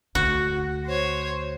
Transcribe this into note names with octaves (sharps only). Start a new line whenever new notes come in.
D2 F#4
C5 C#5